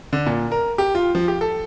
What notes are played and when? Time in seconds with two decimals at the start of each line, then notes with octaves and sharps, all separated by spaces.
0.13 D3
0.26 A#2
0.52 A#4
0.78 G4
0.95 F4
1.15 F3
1.28 G4
1.41 A4